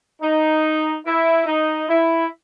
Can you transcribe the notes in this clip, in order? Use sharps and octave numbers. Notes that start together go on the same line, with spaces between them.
D#4
E4
D#4
E4